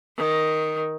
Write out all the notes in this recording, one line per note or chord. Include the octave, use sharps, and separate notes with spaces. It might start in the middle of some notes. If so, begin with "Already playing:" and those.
D#3